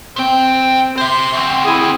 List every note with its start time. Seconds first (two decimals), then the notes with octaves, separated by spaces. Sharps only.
0.16 C3 C4 G5
0.98 C5 E5 C6
1.33 D2 C4
1.65 E4 G#4